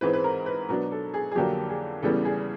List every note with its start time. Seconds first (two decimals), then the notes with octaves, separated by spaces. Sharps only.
0.01 G#2 E3 G#3 C4 B4
0.13 B4
0.24 A#4
0.46 B4
0.69 B2 F#3 B3 D4 A#4
0.92 A4
1.14 G#4
1.32 G#4
1.35 F2 D3 F#3 A#3 G4
1.69 G#4
2.02 E2 C#3 E3 G3 B3 A4
2.25 G#4